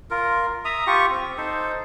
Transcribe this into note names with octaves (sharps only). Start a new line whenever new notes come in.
F4 A#4
E5 A#5 D#6
F4 G4 C#6
C4
D#4 A4 C5